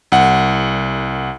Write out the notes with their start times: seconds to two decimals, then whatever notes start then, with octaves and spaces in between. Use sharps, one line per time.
0.12 C2 F#5